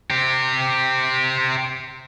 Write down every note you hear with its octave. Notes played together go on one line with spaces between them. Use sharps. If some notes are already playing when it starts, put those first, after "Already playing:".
C4 G4